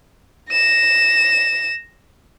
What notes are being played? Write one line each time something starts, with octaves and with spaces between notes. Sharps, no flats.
A#6 E7